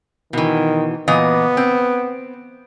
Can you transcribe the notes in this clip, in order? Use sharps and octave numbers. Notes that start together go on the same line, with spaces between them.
B2 D#3 E3
A#2 E3 B3 D#5
C4